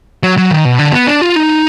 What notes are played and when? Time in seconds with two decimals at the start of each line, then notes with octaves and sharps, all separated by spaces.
0.23 F#3
0.38 F#3
0.51 D#3
0.65 B2
0.79 D3
0.93 B3
1.07 D4
1.21 F4
1.36 D#4